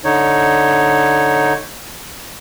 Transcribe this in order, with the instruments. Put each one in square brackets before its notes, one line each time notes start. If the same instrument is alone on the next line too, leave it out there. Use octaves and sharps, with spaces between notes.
[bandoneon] D3 D#4 C#5